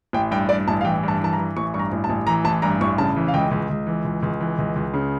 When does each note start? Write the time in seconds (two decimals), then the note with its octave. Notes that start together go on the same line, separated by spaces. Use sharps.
0.13 A1 G5
0.31 G2 G5
0.49 G2 D5
0.68 A1 A5
0.81 F5
0.84 E3 G5
1.03 G2 A5
1.21 E3 A5
1.33 A#5
1.38 E3
1.57 A1 C#6
1.74 G2 C#6
1.79 A#5
1.92 A1
2.04 A5
2.09 A1
2.27 E3 A#5
2.44 A1 A5
2.62 G2 A#5
2.81 A1 C#6
2.98 C#3 A5
3.16 E3
3.28 F5
3.33 C#2 G5
3.51 C#2
3.69 C#2
3.87 E3
4.05 C#2
4.22 C#2
4.40 E3
4.58 C#2
4.76 C#2
4.94 C#3